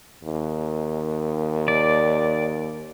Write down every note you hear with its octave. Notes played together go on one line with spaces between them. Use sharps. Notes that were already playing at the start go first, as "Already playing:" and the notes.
D#2
D5